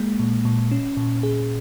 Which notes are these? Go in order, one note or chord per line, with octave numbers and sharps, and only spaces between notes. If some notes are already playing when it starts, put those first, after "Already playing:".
Already playing: G#3 A#3
A#2
A#2
C#4
A#2
G#4